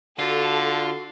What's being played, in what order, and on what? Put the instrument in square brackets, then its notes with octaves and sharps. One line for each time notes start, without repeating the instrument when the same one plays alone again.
[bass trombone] D3 [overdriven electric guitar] F4 [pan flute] F#4 [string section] A4